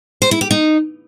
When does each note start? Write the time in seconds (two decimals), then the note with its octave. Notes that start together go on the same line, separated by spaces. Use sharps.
0.22 C5
0.31 E4
0.41 G4
0.51 D#4